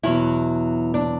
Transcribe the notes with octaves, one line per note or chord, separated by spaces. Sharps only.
E2 B2 F#3 E4
D4